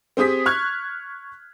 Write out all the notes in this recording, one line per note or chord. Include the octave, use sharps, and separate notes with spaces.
C4 G4 G#4 D#6 B6
C#6 F6 F#6 G#6